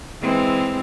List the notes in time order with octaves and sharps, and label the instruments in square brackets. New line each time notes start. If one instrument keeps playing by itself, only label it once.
[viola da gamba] E3 G#3 C4